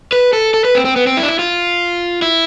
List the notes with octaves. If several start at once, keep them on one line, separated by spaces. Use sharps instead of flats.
B4
A4
A4
B4
C4
C4
B3
C4
E4
D4
E4
F4
E4